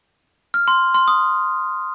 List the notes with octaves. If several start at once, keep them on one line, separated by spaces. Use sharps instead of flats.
F6
C6
C6
D#6